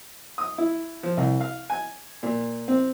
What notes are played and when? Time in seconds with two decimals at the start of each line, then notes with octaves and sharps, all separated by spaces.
0.38 D#6
0.58 E4
1.03 F3
1.17 C2
1.41 F5
1.70 G#5
2.23 A#2
2.68 C4